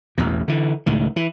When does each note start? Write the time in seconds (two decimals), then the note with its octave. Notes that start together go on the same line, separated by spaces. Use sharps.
0.18 A1 E2 B2
0.48 D3 E3
0.86 C#2 A2 D#3
1.16 E3